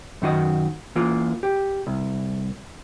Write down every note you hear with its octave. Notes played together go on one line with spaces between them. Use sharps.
F#2 D#3 F#4 D#5
E3 A#3 F4
G4
C2